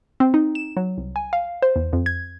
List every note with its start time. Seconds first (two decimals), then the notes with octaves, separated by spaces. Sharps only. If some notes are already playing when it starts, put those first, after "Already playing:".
0.20 C4
0.34 D#4
0.55 E7
0.77 F#3
0.98 C2
1.16 G#5
1.33 F5
1.62 C5
1.76 E2
1.93 F2
2.06 G#6